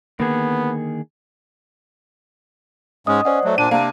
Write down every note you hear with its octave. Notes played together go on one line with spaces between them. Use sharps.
D3 D#3 A#3 B3 G#4
G#2 G#3 C#4 D#5 D#6
C#4 C5 D5 F#5
F#3 A3
A#2 D4 D#7
C3 A#3 D4